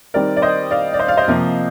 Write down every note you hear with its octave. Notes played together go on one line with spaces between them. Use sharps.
D#3 G3 C4 A#4 D5
D5
C5 D#5
D5 F5
D5
C5 D#5
D5 F5
C5 D#5
C3 F3 A#3